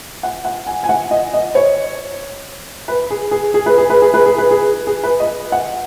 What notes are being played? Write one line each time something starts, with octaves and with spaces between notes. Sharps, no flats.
F#5
F#5
G#5
G#5
F#5
D#5
D#5
C#5
B4
G#4
G#4
G#4
B4
G#4
B4
G#4
B4
G#4
B4
G#4
G#4
B4
D#5
F#5